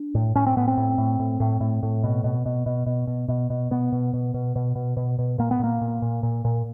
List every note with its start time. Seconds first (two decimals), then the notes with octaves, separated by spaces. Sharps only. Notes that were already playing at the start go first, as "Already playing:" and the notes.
Already playing: D4
0.15 A2
0.35 A2 C#4
0.46 C4
0.57 A2 B3
0.68 C4
0.77 A2
0.98 A2
1.19 A2
1.40 A2
1.60 A2
1.83 A2
2.04 B2
2.24 B2
2.46 B2
2.66 B2
2.86 B2
3.07 B2
3.28 B2
3.50 B2
3.71 B2 B3
3.92 B2
4.14 B2
4.34 B2
4.56 B2
4.75 B2
4.97 B2
5.19 B2
5.38 A#2 A#3
5.51 B3
5.59 A#2 A#3
5.81 A#2
6.02 A#2
6.23 A#2
6.45 A#2